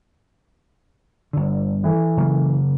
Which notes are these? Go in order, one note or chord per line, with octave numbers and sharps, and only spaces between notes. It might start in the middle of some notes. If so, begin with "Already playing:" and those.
G1 D3
E3 A4
C#3 F#3 A#3